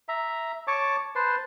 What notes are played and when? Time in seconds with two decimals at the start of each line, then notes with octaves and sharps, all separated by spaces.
0.09 E5 A#5
0.67 C#5 A5 C#6 D6
1.15 B4 C5 A5 C6